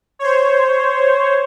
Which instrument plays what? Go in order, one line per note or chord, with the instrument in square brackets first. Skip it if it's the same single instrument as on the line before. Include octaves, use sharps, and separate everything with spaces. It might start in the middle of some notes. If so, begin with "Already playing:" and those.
[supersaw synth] C5 C#5